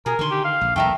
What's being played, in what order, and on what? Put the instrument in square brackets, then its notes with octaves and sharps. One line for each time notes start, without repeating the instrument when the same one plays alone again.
[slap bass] B2 [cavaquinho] G#4 D#6 [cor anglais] A#4
[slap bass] D3 D#3 [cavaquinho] C6 C#6
[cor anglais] G4
F5
[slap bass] A#1
[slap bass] B1 E2 E3 [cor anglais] A3 [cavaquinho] A#4 E5 G5